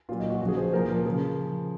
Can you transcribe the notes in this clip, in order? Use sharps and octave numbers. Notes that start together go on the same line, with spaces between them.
A#2 F#3 F4
D#4
F#4
C#3 F3 F#4 G#4
C5
A#2 F3 A#4
A#4
C#3 F3 G#4